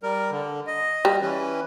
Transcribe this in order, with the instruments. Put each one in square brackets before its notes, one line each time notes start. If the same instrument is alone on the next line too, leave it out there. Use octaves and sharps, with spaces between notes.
[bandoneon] G3 A#4
D3
D#5
[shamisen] G3
[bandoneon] E3 C#4 B4